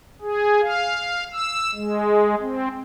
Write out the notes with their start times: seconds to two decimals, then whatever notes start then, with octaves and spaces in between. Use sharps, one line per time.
0.22 G#4
0.61 F5
1.33 E6
1.75 G#3
2.41 C4